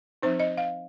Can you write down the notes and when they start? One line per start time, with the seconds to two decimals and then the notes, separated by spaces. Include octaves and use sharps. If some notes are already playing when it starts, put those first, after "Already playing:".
0.22 F3 C4 D#4 C5
0.40 D#5
0.57 F5